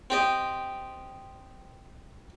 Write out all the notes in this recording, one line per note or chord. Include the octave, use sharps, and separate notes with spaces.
C4 G4 D#5